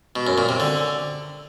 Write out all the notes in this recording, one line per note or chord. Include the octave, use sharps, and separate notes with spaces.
B2
F#2
A#2
C3
D3